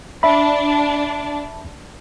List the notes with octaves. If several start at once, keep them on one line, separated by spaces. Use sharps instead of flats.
D4 E5 B5